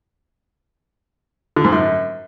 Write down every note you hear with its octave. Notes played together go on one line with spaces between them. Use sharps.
D3
G#2
F#2